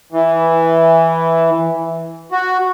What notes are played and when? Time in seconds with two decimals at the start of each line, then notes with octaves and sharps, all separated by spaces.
0.12 E3
2.32 F#4